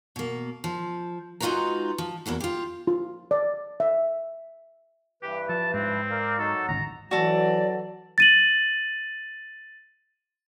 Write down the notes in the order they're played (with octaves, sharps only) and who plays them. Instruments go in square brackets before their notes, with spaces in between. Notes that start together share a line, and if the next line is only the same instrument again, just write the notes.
[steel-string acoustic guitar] B2 A#3
F3
G#3 D#4 F4 F#4 B4 A#5
F3
E2 A#3 E4 F#4
F4 G4
[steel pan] F4
D5
E5
[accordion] G2 E3 B4 [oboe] G4
[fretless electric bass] F3 [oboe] A5
[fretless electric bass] G#2 [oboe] C4
[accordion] A#4 D5 F5
[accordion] F#3 D#4 F#4 [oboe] A4
[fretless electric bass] D1 G#1 C#3 [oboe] A#5
[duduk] E3 [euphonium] F#3 [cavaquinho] F#4 A4 [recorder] D5
[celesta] A6 D#7 F#7